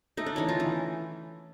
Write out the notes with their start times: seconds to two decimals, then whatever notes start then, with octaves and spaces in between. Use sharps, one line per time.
0.17 A3 D#4
0.26 D4
0.36 E3 C#4 D#4
0.49 D#4 F4
0.60 E3